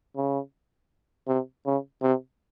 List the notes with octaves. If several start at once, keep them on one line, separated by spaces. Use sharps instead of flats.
C#3
C3
C#3
C3